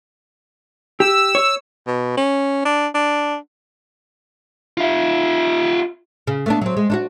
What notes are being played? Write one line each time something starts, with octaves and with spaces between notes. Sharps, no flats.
G4 E6
C#5
B2
C#4
D4
D4
F4 E5
C#3
A3 B3 D4
F#3 C4
G#3
D4 D#4 F#4